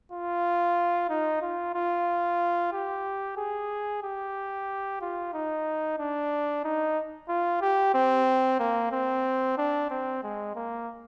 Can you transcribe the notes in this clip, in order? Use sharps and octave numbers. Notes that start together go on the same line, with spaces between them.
F4
D#4
F4
F4
G4
G#4
G4
F4
D#4
D4
D#4
F4
G4
C4
A#3
C4
D4
C4
G#3
A#3